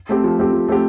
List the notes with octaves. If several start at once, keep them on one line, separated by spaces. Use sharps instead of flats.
A3 C4 G4
F3
A3 C4 G4
F3
A3 C4 G4